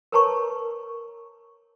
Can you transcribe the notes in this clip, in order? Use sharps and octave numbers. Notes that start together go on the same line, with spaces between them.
A#4 B4 C#5 A5 A#5 C#6